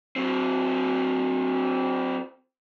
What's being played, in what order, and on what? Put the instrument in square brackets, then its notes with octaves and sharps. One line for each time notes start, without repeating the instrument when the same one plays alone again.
[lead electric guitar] F#3 C4